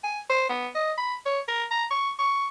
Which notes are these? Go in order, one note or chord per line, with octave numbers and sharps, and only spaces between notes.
G#5
C5
B3
D#5
B5
C#5
A#4
A#5
C#6
C#6